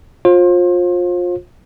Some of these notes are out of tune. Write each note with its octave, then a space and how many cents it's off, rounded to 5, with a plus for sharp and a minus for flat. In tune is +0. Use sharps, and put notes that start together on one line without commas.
F4 +25 C5 +35